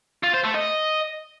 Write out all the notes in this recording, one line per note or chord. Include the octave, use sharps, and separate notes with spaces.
F4
C5
A3
D#5